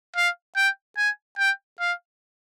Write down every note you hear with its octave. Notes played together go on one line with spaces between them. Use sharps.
F5
G5
G#5
G5
F5